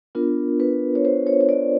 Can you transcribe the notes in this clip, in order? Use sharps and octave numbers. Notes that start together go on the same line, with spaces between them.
B3 D4 F4 A#4
B4
C#5
C5
C#5
C#5
D5